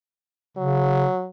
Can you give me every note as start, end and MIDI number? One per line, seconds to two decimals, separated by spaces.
0.57 1.06 49
0.57 1.28 54